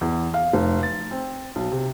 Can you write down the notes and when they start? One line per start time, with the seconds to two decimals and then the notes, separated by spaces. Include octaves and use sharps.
0.01 E2
0.34 F5
0.53 F1
0.83 A6
1.11 C4
1.56 B1
1.72 C3